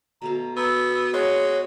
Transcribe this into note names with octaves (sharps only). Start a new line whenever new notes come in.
B2 A3 F5 A#5
B3 E6
G#3 F#4 C#5